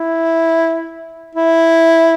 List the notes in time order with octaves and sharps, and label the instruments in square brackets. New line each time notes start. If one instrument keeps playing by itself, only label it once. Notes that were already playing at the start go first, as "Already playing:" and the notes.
Already playing: [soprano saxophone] E4
E4